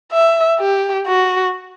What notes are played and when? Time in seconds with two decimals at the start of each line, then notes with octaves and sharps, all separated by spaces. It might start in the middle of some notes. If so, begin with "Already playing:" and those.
0.12 E5
0.60 G4
1.07 F#4